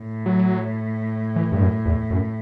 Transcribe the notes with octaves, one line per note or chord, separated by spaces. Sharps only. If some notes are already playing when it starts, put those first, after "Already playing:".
Already playing: A2
F#3
E3
G2
F#2
E2
F#2